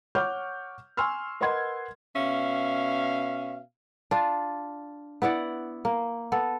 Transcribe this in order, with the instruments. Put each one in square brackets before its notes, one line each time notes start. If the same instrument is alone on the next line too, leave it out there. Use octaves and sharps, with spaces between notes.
[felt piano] C#5 F#5 C#6 D6 F6 G6
G#5 C6 C#6 E6 F6
A#4 B4 D#5 F#5 C6 G#6
[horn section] B2 C#4 E5 F5
[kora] D4 F4
B3 E4 D5 F#5
A#3
B3 A4